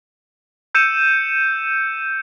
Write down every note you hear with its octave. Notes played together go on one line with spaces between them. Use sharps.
E6 G6 C#7 D#7 E7